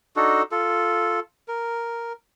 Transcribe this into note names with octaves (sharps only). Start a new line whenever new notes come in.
D4 D#4 F#4 A4
F4 A4
A#4